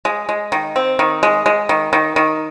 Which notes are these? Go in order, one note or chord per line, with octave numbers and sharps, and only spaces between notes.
G#3
G#3
D#3
C4
D#3
G#3
G#3
D#3
D#3
D#3